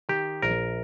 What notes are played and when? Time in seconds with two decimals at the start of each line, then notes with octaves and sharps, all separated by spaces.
0.09 D#3 G4
0.42 A#1 A#4